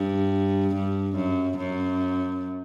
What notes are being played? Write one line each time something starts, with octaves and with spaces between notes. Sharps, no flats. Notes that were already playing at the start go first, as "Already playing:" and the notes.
Already playing: G2
G2
F#2
F#2